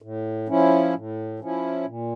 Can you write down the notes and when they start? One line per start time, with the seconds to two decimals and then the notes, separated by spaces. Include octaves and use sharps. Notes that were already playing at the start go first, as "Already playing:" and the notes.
0.02 A2
0.49 F3 C#4 E4
0.94 A2
1.39 F3 C#4 E4
1.86 A#2